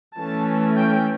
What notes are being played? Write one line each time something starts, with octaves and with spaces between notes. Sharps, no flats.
E3 A3 C#4 A5
G5